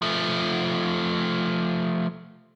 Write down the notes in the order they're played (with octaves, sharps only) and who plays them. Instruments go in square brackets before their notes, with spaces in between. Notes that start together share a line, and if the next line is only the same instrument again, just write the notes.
[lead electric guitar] F3 A3